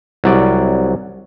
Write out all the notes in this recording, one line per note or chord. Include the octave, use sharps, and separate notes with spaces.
C2 F#3 D5